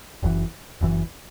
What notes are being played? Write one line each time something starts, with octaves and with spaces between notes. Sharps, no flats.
F#1 F#2 E3
F#1 F#2 E3